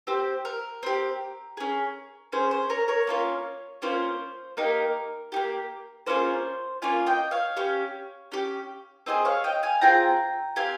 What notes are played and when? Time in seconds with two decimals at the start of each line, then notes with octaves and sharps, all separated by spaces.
0.07 C4 G4 C5
0.45 A#4
0.83 C4 G4
1.57 C#4 G#4
2.32 C#4 G#4 C5
2.51 C5
2.70 A#4 C#5
2.88 A#4 C#5
3.07 A#3 C#4 F4
3.82 A#3 C#4 F4 C5
4.57 A#3 D#4 G4 A#4
5.32 D#4 G4
5.36 A#3
6.07 A#3 C#4 F4 G#4 C5
6.82 A#3 C#4 F4 F5 G#5
7.06 D#5 G5
7.31 C#5 F5
7.57 C#4 G4
8.32 C#4 G4
9.06 C4 F4 G#4 C5 D#5
9.25 C#5 F5
9.44 D#5 G5
9.63 F5 G#5
9.81 C4 F4 G#4 G5 A#5
10.56 C4 G4 F5 G#5